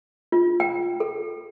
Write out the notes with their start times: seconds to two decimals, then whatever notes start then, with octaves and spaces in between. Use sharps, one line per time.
0.32 F4
0.60 G5
1.00 A4